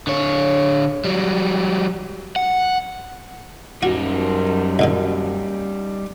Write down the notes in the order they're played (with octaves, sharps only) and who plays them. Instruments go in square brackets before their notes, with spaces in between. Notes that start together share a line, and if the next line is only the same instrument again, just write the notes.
[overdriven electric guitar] D3 C#5
F#3 G3
F#5
[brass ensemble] F#2 [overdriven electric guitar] G3 D#4 [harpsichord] F#4
[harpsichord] C2 G#2 D3